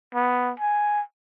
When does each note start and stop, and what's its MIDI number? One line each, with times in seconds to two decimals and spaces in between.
0.14 0.52 59
0.60 1.01 80